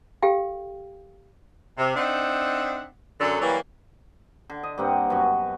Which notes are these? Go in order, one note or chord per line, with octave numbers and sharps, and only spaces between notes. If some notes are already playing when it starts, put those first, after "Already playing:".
G4 A4 F5 G5
C3
C4 D4 D#4 E5 F#5
F#2 D3 F#3 A4
E3 F#3 G3 A#3
D3
D#5
G2 A#3 C4 F#5
F#2 B2 C#4 F#4